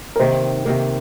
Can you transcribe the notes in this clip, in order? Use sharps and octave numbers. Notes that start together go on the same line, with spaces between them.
A#4
C3 D#3 A#3 C5
C3 D#3 A#3 A#4